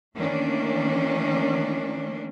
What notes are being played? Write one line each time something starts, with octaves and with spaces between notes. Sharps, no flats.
D#3 E3 A3 A#3 C#4 D4